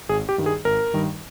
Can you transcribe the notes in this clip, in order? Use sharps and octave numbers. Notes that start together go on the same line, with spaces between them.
G#1 G#4
G4
G2 D#3 G3
G#4
G#1 A#4
G2 D#3 G3